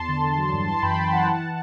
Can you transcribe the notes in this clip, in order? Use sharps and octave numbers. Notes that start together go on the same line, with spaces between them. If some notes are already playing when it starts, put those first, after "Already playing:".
Already playing: E2 A5 C6
D3
D3
F#3
G2
E3 A5 C6
F#2 G5 B5
E3 A5 C6
E3 F#5 A5
E3
E3